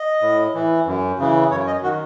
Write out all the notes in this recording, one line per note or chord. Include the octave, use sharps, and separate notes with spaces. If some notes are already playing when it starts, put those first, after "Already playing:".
Already playing: D#5
A2
E3
F#2
C#3 E3
F#2 C#5
D#5
D#3 F#4